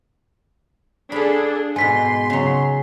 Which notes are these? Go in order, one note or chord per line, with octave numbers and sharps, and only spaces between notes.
D4 G#4 A4 F5 B5
G#2 B2 G#5 C6 B6
C#3 F#3